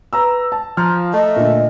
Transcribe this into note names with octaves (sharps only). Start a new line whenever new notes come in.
B4 A#5 E6
A5
F3 A#5 F6
A3 D#5
A#2 D3